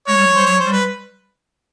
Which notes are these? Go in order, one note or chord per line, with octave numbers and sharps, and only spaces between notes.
G#3 C#5
G3
F#3
G3 C5
F#3 C#5
C5
G3
B4